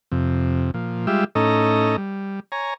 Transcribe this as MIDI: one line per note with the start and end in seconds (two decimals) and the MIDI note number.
0.12 0.71 41
0.12 0.71 48
0.74 1.06 46
0.74 1.06 53
1.07 1.24 55
1.07 1.24 56
1.07 1.24 65
1.07 1.24 67
1.07 1.24 76
1.35 1.96 45
1.35 1.96 61
1.35 1.96 63
1.35 1.96 69
1.35 1.96 75
1.35 1.96 82
1.98 2.40 55
2.52 2.74 73
2.52 2.74 80
2.52 2.74 82